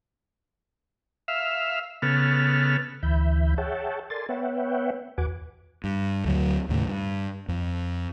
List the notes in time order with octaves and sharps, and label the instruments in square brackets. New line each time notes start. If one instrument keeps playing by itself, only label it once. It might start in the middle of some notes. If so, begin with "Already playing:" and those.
[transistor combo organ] E5 F5
C#3 B3 A4 F6
[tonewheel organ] D2 E3 E5 B5 G6
G#4 C#5 E5 F#5 G5 A5
A4 A#4 D5 G#5 C6 A6
B3 B4 C#5 E5 F#5 G5
E2 F#4 B4 F#5 G#5 D6
[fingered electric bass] G2
D2 D3 D#3 F#3
D#2 A2 C#3
G2
F2